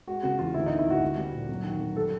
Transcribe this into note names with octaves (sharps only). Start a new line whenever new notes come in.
G#3 F#4
C#3 F#4
E2 F4
D2 E4
D#4
D3
E4
D2 F#4
G3
G3
A#2
F#2
D#3
F#2
G3 A4